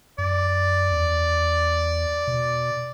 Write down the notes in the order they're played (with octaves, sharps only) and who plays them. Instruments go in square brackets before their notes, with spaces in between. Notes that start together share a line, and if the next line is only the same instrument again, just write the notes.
[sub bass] F#2 [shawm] D5
[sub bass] E2
B2